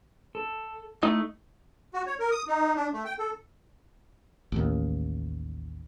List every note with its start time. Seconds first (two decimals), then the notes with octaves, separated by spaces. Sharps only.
0.35 A4
1.03 A3 D#4 E4 D#5
1.94 F#4
2.07 C#5
2.20 A#4
2.31 D#6
2.48 D#4
2.76 D4
2.93 A3
3.05 G5
3.19 A4
4.52 A1 D#2